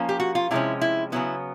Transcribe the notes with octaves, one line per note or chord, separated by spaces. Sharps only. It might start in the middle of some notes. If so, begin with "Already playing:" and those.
Already playing: F3 A#3 C#4
G4
F#4
F4
C3 F3 G#3 C#4 E4
E4
C#3 F#3 B3 E4